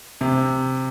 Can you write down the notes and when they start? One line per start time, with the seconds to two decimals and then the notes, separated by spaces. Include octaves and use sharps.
0.21 C3